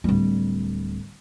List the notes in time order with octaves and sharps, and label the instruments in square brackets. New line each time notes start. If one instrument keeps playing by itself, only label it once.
[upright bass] D1 G3